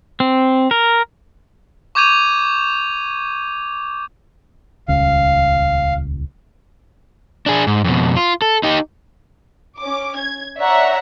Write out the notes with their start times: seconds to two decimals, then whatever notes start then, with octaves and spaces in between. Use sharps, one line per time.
0.20 C4
0.71 A#4
1.95 C#6 D6 G6 G#6 D#7 F7
4.88 D#1 C#2 F5
7.46 D4 G#4
7.67 G#2
7.84 F2 B2
8.17 F4
8.42 A4
8.63 D#4 G4
9.79 C#4 D6
10.17 G#6
10.58 C#5 D5 E5 F#5 A#5